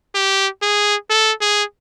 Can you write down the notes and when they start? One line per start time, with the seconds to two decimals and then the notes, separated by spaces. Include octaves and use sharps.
0.15 G4
0.62 G#4
1.10 A4
1.41 G#4